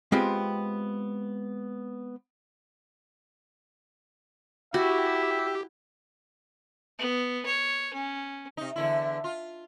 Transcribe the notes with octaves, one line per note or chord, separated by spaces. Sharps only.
G#3 B3 C4 F4 G4
E4 F#4 G4 E5
B3
C#5
C#4
C3 D#4
E2 D3 E4
F4